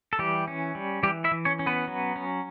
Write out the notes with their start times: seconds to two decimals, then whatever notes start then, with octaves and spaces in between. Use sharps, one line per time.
0.13 A4
0.19 E3 G3 G4
0.48 C#4
0.75 G3
1.03 E3 G3 G4
1.24 E4 E5
1.31 E3
1.45 C#4 C#5
1.59 C#4
1.66 B3 B4
1.87 F#3
2.16 C#4